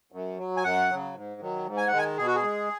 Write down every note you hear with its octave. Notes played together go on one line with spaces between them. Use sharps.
F#2
F#3
G#5
F#2 F#5
C#3 F#3
G#2
D#3 F#3
G#2
G#5
D#3 G#3 F#5
G#5
B2 G#4
F#4
G#4
G#3